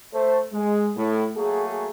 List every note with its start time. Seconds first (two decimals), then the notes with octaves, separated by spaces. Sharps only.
0.14 A3 C5
0.53 G#3
0.96 A2
1.37 F#3 A3 A#3 F#4 G#4